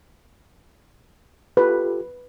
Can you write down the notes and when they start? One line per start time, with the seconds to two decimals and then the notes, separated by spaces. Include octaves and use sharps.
1.57 F4 G4 A4 B4